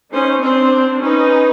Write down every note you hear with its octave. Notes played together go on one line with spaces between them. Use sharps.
C#4 D#4 C5
C4 D4 C5
C#4 D#4 B4